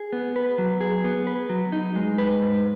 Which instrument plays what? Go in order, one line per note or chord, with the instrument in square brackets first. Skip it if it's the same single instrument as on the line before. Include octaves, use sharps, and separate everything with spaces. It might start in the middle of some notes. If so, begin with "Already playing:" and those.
Already playing: [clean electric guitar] G#4
B3
B4
F#3
G#4
B3
B4
F#3
D#4
G#3
B4
G#2